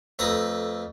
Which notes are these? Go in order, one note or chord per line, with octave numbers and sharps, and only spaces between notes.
F2 A3 B4 A#5 D#6